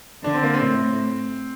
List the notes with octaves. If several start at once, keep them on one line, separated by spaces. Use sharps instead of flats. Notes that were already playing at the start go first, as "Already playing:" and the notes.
D3 D4
C4
A#3
C4
A2